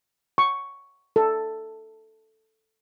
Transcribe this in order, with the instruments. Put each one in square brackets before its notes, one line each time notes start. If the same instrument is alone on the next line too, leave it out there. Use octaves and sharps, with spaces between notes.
[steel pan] C#6
A4